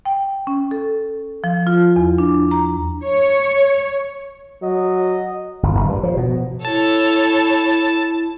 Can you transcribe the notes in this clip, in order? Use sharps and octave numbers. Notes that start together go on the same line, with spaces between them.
G5
C#4
A4
F3
F4
E2
D4
A#5
C#5
F#3 D#5
G1
F#1
G2
F3
B2
E4 A4 C#5 A5